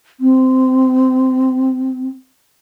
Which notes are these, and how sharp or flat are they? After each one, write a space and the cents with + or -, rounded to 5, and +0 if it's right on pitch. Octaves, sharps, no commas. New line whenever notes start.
C4 -15